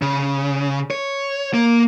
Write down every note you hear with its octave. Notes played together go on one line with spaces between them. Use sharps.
C#3
C#5
A#3